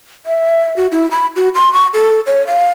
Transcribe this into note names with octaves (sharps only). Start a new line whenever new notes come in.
E5
F#4
E4
B5
F#4
C6
C#6
A4
C#5
F5